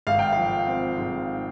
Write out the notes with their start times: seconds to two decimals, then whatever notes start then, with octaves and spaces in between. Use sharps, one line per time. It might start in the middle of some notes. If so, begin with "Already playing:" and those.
0.07 G#1 F5
0.19 G5
0.33 F3 F5
0.68 C4
0.98 G#2